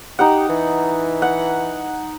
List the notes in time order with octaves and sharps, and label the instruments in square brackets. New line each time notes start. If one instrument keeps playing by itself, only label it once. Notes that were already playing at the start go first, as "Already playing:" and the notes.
[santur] D#4 F#5 [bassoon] G4
[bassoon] E3
[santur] F#5